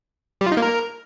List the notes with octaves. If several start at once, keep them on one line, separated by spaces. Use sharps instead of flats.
G3
F4
D#4
A#3
A#4